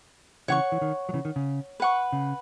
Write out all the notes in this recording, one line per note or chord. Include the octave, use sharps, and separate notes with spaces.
C#3 E3 C#5 F#5 C#6
E3
D#3
F#3
C#3 E3
D#3
C#3
B4 F#5 C#6
C#3